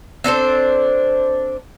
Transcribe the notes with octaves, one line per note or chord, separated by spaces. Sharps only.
C4 D4 A4 C5